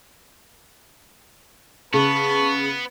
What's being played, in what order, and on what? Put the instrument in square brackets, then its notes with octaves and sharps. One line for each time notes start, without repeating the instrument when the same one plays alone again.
[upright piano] C#3 [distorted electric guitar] B3 [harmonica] B4 A5 C#6